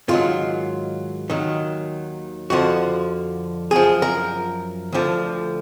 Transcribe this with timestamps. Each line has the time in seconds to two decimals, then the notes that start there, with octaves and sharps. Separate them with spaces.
0.08 G#2 D#3 F#3 F4
1.30 D#2 D#3 F#3
2.50 F2 D3 F3 F#4
3.71 F#2 F3 G#4
4.02 A#4
4.92 D2 D3 F3